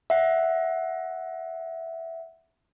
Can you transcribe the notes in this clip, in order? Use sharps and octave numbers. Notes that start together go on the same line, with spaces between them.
E5 F#5